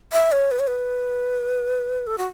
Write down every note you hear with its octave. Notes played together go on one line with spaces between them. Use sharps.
E5
C#5
B4
C#5
B4
A4
F#4